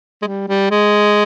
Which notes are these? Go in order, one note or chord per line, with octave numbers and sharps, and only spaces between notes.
G#3
G3
G3
G#3